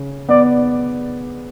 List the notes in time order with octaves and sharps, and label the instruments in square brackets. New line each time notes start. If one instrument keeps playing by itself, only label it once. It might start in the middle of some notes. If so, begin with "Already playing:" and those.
Already playing: [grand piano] C#3
[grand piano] B3 [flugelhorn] D5